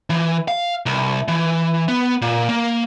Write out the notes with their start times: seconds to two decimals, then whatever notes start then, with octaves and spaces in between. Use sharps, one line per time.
0.10 E3
0.48 F5
0.86 C2
1.28 E3
1.88 B3
2.22 A#2
2.49 A#3